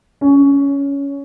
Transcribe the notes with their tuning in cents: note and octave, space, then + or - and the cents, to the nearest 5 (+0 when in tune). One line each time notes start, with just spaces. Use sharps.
C#4 +15